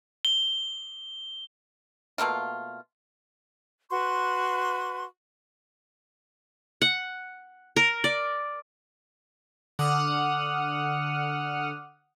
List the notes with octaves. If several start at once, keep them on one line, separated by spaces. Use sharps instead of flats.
G7
B2 A3 A#3 F4
F#4 B4 C6 C#6
F#5
A#4
D5
D3 F#5 D6 D#6 F6